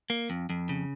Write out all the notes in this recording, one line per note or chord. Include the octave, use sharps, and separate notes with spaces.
A#3
F2
F2
C#3